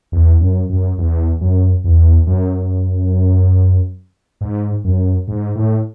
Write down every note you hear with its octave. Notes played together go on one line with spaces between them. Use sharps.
E2
F#2
F#2
E2
F#2
E2
F#2
G#2
F#2
G#2
A2